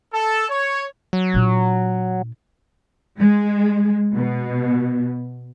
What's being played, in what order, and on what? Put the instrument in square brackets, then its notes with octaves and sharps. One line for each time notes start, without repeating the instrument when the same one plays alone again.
[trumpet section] A4
C#5
[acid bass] F#3
[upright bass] A#2 D4
[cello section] G#3
B2